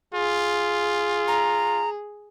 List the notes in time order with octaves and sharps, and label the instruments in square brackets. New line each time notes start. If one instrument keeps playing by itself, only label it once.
[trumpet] F4 [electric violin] G#4
[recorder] A#5